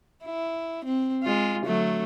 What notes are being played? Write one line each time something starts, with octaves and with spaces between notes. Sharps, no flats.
E4
C4
G#3 F4
D3 F#3 A3